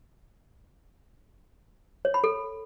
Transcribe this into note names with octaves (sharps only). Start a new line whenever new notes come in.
C#5
B5
A4